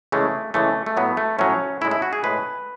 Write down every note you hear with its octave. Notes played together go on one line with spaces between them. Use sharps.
C#3 E3 G#3 A3
C#3 E3 G#3 A3
A3
A2 F#3 B3
A3
A2 F#3 C#4
A2 G#3 E4
E4
F#4
G#4
A2 G#3 B4